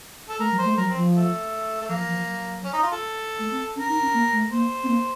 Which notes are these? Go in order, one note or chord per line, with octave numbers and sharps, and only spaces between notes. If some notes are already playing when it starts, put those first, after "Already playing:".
A4
A3 A#4
F#3
C5
A3
F#3 A#4
C4
F3
A3
A3
F3 A#3
F3
F#3
C#4
D#4
F4
A4
A3
C4
C#4 A#4
D#4
C#4
A#3
A3
A#3 C5
C4
A#3